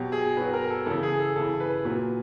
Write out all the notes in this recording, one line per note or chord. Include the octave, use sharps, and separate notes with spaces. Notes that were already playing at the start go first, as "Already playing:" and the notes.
Already playing: B2 F#3 G4
G#4
B2 F#3 B4
A#4
A4
C#3 E3 A4
G#4
A4
C#3 E3 A4
B4
A#2 F#3 B4